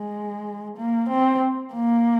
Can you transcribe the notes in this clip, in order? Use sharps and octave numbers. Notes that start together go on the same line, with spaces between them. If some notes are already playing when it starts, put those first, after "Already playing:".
Already playing: G#3
A#3
C4
A#3